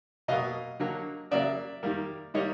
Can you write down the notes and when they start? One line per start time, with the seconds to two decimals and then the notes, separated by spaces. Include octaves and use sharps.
0.28 B2 F#3 A#3 D#5 F5
0.80 D3 F#3 A#3
1.31 C#3 F#3 A#3 D5 E5
1.83 D#3 G3 A#3
2.34 D#3 G3 A#3 C#5 D#5